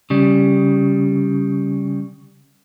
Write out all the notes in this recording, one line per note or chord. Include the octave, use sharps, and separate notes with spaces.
C#3 G3